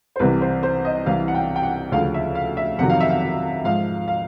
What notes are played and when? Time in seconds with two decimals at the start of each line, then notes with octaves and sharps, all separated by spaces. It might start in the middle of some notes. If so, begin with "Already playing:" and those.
0.16 C5
0.19 C2 C3 E3 B4
0.41 C5
0.63 C5
0.85 D#5
1.06 C2 C3 E3 F5
1.28 F#5
1.34 G5
1.56 G5
1.63 F#5
1.92 D2 C#3 F3 F5
2.14 E5
2.35 F5
2.57 E5
2.78 F2 C3 D#3 F#3 F#5
2.90 F5
3.00 E5
3.10 F5
3.64 G#2 F3 F5
4.08 F5